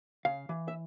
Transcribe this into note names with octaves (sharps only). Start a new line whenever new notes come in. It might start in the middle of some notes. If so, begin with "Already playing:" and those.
C#3 F5
E3
E5